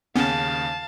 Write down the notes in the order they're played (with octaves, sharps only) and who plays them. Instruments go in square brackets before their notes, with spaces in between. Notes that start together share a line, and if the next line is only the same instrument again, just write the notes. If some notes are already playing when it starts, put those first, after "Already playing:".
[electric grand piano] D#2 C#3 [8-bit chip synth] B3 C#4 [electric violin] F5 A5